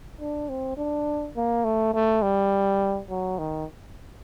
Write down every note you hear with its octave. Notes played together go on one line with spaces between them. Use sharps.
D4
C4
D4
A#3
A3
A3
G3
F#3
D#3